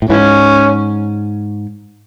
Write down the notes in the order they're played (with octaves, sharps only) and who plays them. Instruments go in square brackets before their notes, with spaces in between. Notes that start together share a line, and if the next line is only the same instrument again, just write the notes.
[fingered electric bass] A2
[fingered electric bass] G#2 [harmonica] E3 C#4